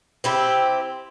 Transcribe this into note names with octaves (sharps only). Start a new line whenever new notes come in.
C4 E4 G4